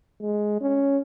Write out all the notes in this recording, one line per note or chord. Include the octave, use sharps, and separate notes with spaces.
G#3
C#4